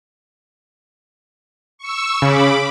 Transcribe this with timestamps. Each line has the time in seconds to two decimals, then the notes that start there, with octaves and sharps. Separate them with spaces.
1.78 C#6 E6
2.22 C#3 B5 D6